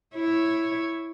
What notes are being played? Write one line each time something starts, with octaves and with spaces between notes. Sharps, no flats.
E4 C#5